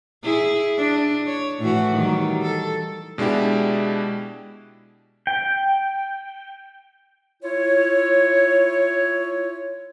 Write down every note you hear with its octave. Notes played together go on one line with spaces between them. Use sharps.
E4 G#4
D4
C#5
A2 E3 F#4
D#3 F#3 G3
A4
B2 G#3 D4 E4 G4
G5
E4 F4 C#5